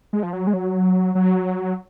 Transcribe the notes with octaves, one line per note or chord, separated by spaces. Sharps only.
G#3
F3
F#3
G#3
F#3
F#3